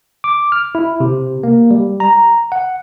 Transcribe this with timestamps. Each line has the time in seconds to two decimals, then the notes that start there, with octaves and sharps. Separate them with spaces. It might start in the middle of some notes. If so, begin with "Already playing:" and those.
0.24 D6
0.52 F6
0.75 E4
1.00 C3
1.43 A#3
1.71 G3
2.00 A#5
2.52 F#5